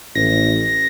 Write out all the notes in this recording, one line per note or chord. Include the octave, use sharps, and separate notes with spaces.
A1 A#6